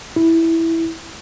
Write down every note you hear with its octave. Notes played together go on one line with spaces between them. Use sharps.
E4